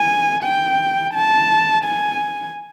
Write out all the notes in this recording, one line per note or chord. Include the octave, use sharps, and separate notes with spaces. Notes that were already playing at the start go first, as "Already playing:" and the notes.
Already playing: G#5
G5
A5
G#5